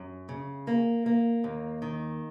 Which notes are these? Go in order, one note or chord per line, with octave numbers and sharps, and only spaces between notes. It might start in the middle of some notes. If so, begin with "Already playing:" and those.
Already playing: F#2
C#3
A#3
A#3
D#2
D#3